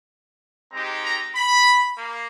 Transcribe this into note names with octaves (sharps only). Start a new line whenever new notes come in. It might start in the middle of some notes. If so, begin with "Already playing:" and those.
G#3 C4 D#4 G4 A#5
A#5
B5
A#3